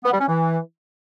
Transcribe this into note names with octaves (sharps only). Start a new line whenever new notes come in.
B3
G3
C#4
E3